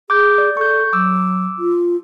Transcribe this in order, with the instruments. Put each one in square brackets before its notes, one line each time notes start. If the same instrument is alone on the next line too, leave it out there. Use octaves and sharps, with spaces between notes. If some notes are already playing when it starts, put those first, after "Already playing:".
[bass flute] G#4 [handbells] D6 G6
[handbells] D5
[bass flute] A4 [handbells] C#6 G6
[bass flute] F#3 [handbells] D6 E6
[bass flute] F4